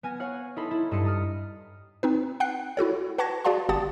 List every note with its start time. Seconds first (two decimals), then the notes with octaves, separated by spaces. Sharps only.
0.03 B3 G#5 F6 A#6
0.20 C#5 F5 F#5 F6
0.56 D#4 E4 A4 B5 C6
0.71 E4
0.91 G2 A4 D#5 B5 C6 C#7
1.05 A#5 D#6 F6
2.03 C4 D#4 B4
2.40 F#5 G5 F#6 C7
2.77 E4 F#4 A4 C#5
3.18 B4 F#5 A5 C#6 G#6 A#6
3.44 F#4 G#4 D5 F5 A5 C6
3.69 G1 G4 F#5 A5 D#6 A6